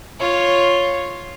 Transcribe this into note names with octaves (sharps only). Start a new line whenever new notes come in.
F4 C#5